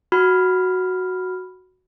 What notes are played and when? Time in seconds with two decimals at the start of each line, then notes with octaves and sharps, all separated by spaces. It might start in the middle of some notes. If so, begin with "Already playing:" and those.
0.12 F#4 B5 F6